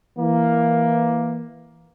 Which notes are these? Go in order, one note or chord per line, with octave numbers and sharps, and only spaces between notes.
E3 A#3